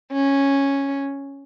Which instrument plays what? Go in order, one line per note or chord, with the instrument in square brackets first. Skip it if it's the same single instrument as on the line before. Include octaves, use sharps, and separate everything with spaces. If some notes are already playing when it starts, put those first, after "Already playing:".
[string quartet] C#4